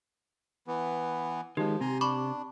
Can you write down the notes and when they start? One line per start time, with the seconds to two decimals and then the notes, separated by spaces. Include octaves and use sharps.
0.67 E3 B3
1.57 D#3 F3 G#3 G4
1.81 C3 G#5 A#5 C6
2.01 D4 B5 C#6 D6